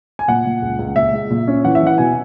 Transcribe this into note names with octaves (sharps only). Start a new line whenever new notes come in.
G#5
A#2 F#5
A#2
C#2
C#2
A#2 E5
G#3
A#2
C#4
E3 F#5
E5
E3
F#5
B2 G#5